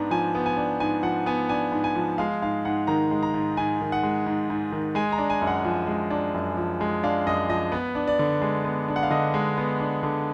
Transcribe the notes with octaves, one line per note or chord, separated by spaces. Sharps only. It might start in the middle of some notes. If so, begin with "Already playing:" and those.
Already playing: G#2 B3 D4 A#5
F3 G#5
B3
G#5
D4
G#2 G#5
F3 F#5
B3 G#5
D4 G#5
G#2
G#5
F3
G#3 F5
G#2 F5
G#2 F#5
D#3 A#5
G#3
A#5
G#2
G#2 G#5
D#3
F#5
G#3
G#2
G#2
D#3
G#3 G#5
A#5
D4
G#5
F#2
F#5
F3
G#3
D4
F#2
F3
G#3
D4 F5
F#2 D#5
F3 D#5
B3 B4
D4
D5
D3
G#3
B3
D4
F#5
F5
D3 D#5
G#3
B3
D4
D3